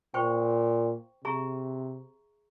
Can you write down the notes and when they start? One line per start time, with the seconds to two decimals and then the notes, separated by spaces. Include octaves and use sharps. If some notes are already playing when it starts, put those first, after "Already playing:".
0.14 A#2 C5 G5 C#6
1.25 C3 G#4 E5 A#5 C#6